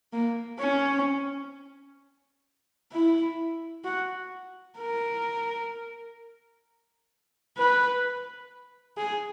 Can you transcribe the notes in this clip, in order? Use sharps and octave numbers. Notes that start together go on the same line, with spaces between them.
A#3
C#4
E4
F#4
A#4
B4
G#4